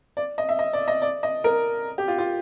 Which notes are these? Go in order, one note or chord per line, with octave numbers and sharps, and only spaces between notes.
D5
D#5
E5
D#5
D5
D#5
D5
D#5
A#4
G4
F4
F4